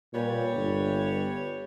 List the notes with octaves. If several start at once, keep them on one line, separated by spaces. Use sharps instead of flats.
A#2 G3 B4 C#5
G1